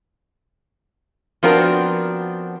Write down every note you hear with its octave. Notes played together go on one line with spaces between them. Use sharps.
F3 B3 C4 D4 F#4 A#4